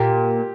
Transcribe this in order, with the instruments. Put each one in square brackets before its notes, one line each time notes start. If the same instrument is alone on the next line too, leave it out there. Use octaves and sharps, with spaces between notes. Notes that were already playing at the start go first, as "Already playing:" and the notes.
Already playing: [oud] A#2 [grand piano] G4